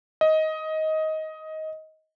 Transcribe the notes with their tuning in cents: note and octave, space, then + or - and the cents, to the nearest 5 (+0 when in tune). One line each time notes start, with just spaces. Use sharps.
D#5 +15